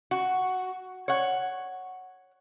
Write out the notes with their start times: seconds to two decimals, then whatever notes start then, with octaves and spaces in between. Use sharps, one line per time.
0.11 F#4
1.08 C#5 F#5